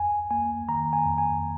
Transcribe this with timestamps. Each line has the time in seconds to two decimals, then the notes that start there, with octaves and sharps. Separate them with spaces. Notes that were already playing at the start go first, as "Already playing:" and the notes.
Already playing: F2 G#5
0.31 A#3 G#5
0.68 D#3 A#5
0.93 G#5
1.05 F2
1.18 G#5